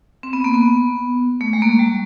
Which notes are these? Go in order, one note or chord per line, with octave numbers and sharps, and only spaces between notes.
C4
B3
A#3
B3
A3
G#3
A#3
A3
G3